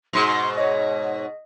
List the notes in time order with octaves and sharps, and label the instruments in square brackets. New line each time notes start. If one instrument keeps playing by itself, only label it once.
[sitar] G#2 B2 [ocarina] C6
[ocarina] C#5 [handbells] D#5